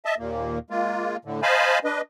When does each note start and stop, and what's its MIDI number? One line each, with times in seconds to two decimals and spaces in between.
0.05 0.15 75
0.05 0.15 76
0.05 0.15 81
0.19 0.59 39
0.19 0.59 46
0.19 0.59 58
0.70 1.17 56
0.70 1.17 58
0.70 1.17 65
1.25 1.41 45
1.25 1.41 50
1.42 1.79 72
1.42 1.79 75
1.42 1.79 77
1.42 1.79 80
1.42 1.79 81
1.42 1.79 83
1.84 2.01 62
1.84 2.01 71
1.84 2.01 75